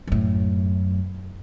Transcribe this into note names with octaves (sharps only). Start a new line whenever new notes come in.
F#2 A2